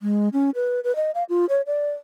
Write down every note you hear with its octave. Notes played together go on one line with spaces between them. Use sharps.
G#3
C#4
B4
B4
D#5
F5
F4
C#5
D5